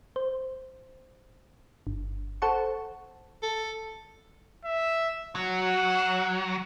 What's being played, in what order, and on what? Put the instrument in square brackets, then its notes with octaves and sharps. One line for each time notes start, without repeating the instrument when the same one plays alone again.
[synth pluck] C5
G1
A4 C5 F#5 A5 C#6
[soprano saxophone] A4
[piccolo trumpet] E5
[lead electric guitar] F#3 [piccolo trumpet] F#5